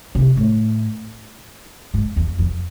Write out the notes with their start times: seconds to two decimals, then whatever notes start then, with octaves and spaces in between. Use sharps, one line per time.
0.15 C3
0.37 A2
1.94 G#2
2.16 E2
2.39 F2